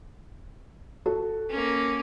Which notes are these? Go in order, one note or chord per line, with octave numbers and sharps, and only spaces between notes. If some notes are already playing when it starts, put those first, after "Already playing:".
F#4 A4
A#3 C#4